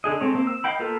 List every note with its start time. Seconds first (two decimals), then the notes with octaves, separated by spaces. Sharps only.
0.04 D3 D4 G#4 D#5
0.21 G#3 A3 C4 C#5
0.35 A#3 C4
0.47 E6
0.64 D#5 F5 G5 B5
0.79 A#3 B3 F4 A4 A#4